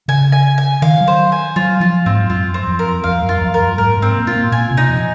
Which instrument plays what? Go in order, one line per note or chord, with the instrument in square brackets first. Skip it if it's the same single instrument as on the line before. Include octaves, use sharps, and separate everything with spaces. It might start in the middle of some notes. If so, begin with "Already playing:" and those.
[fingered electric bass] C#3 [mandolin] G#5
[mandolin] G#5
G#5
[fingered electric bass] D#3 [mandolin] F5
[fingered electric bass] F#3
[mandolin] C5
G#5
[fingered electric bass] F#3 [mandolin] F4
[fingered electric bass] F3 [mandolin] F4
[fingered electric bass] G#2 [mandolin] C4
[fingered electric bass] F#2 [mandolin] F4
[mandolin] C4
[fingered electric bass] F2
[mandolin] A#4
[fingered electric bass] F2 [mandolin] F5
[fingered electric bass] F#2
[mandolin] F4
[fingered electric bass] F2
[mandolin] A#4
[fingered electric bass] F#2
[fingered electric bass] G#2 [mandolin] A#4
[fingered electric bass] G#2
[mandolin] C4
[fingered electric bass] A#2
[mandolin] F4
[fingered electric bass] A#2
[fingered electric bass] A#2 [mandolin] G#5
[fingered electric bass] C3
[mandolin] D#4
[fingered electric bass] F2